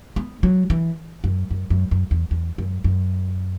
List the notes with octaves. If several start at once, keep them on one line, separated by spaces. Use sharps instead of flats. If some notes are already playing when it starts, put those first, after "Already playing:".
B3
F#3
E3
F#2
F#2
F#2
F#2
E2
E2
F#2
F#2